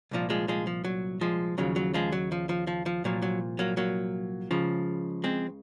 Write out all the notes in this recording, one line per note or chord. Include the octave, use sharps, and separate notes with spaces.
C2 A#2 F3
F3 G#3
F3 G#3
F3
F#3
F3 G#3
D#2 C#3 F3 F#3
F#3
F3 G#3
F#3
F3
F3
F3
F3
C2 A#2 F3 F#3
F#3
F#3 A#3
F#3 A#3
C#2 C#3 F3
G#3 C4